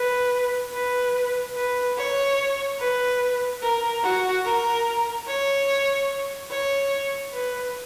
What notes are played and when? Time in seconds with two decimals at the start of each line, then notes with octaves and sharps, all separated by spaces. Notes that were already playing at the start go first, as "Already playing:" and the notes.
Already playing: B4
0.74 B4
1.56 B4
1.97 C#5
2.80 B4
3.62 A#4
4.03 F#4
4.45 A#4
5.27 C#5
6.51 C#5
7.33 B4